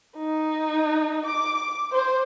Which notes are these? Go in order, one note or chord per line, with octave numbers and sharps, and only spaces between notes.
D#4
D6
C5